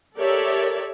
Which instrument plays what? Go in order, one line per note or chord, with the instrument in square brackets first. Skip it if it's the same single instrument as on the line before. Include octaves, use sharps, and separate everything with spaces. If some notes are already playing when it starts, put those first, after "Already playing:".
[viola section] G4 A4 A#4 C#5 D5 E5